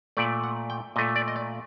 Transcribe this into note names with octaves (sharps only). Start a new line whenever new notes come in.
A#2 A3 D5
F#5
G5
A#2 A3 D#5
D5
D#5
D5